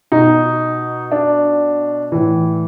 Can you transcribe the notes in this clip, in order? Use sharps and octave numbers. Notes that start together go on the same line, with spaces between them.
B2 D#4
D4
A2 E3